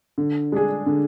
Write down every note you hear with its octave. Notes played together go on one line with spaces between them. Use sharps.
D3
G#3 D4 G#4
D3